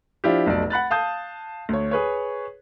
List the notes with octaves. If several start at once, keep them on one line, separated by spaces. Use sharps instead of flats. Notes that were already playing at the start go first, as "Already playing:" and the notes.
F3 D4 E4 F4 G4
F1 B1 B2 D5
F#5 B5 F#6 A6
F5 A5 D#6 G6
D2 C#5
G#4 B4 C#5